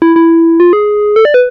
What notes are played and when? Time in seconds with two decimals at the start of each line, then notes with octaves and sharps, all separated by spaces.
0.02 E4
0.16 E4
0.60 F4
0.73 G#4
1.16 A4
1.25 D5
1.34 B4